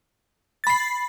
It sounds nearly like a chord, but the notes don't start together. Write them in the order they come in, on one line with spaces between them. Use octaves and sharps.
A6 B5 C7